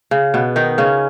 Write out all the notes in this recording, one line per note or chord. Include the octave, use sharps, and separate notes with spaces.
C#3
B2 B3
D#3 D#4
C#3 C#4